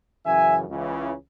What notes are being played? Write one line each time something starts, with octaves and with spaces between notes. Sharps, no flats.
F#2 C#3 E3 E5 G#5
C#2 C#3 E3